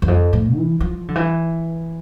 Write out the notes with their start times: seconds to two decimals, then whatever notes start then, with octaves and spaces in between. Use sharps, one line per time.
0.02 E2
0.08 F2
0.33 A2
0.55 E3
0.81 F3
1.08 D3
1.15 E3